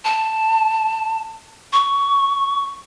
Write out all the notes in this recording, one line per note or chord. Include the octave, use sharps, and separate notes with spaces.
A5
C#6